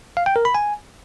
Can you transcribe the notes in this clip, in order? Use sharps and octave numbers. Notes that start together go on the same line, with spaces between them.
F5
G5
A#4
B5
G#5